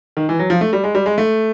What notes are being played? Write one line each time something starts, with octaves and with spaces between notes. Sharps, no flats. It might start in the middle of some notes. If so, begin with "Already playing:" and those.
D#3
E3
F#3
F3
A3
G3
G#3
G3
G#3
A3